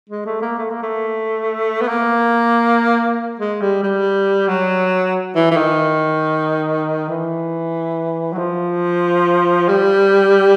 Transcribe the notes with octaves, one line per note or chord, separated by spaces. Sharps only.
G#3
A3
A#3
A3
A#3
A3
B3
A#3
G#3
G3
G3
F#3
E3
E3
D#3
E3
F#3
F3
G3